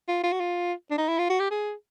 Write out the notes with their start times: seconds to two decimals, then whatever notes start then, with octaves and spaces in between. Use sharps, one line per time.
0.09 F4
0.24 F4
0.33 F#4
0.40 F4
0.91 D4
0.98 D#4
1.08 E4
1.19 F4
1.30 F#4
1.40 G4
1.51 G#4